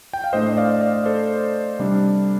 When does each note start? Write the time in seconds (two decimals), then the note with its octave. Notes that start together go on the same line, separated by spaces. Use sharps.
0.13 G5
0.24 F5
0.33 A2 A3 D4 C5 D#5
0.53 D#5
0.57 D5 F5
0.81 D5 F5
1.06 A4 C5
1.79 C3 G3 D4